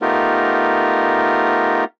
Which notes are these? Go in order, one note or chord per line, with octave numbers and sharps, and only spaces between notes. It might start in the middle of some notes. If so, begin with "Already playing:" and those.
A3 B3 D#4 F4 G4 A#4